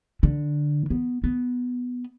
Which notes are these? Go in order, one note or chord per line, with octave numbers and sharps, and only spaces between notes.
D3
B3
B3